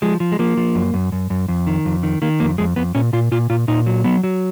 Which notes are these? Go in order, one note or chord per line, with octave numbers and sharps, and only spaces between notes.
F3 G#3
F3
G#3
F3 A#3
F3
F#2
F#2
F#2
F#2
F2
D#3
F2
D#3
D#3 A#3
F2 A#3
F2 G#3
F2 B3
A#2 C#4
A#2 F4
A#2 F4
A#2 F4
A#2 D#4
F#3
F#3 B3
F#3